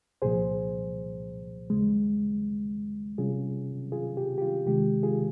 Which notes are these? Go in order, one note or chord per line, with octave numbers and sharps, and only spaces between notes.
C2 A#2 F3 G#4 C5
D#2 C#3 G#3
C3 G3 C#4 F4 G#4
F4 G#4
G4
G4
F4
C3 D#3 G#3 G4
F4 G#4